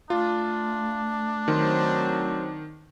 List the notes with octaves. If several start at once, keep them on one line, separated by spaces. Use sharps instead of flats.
A3 D4 F4
D#3 F#3 C4 C5